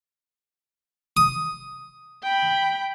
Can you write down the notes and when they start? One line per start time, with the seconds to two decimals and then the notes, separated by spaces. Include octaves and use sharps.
1.17 D#6
2.23 G5 B5